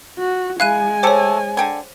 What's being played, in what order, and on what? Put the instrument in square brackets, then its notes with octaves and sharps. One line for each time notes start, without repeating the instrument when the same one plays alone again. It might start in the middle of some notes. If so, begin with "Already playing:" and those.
[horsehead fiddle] F#4
[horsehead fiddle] G#3 G#5 [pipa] E4 [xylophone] F5 F#6 D#7
[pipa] A3 G4 A4 [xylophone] C5 C#5
[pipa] D3 G5 G#5